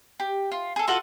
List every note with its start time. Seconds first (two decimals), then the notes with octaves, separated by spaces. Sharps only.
0.20 G4
0.52 F4
0.76 G#4 A4
0.87 F4 F#4 A4 F#5